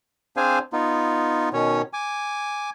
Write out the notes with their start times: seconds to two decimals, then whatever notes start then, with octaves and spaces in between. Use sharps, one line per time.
0.37 C4 D4 G#4 C5 F5 G#5
0.73 B3 D#4 F4
1.53 B2 D#3 C#4 C#5
1.93 G#5 D6